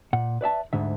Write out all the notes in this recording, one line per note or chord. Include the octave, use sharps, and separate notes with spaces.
A#2 F#5
B4 D5 E5 A5
D2 G#2 D3 E5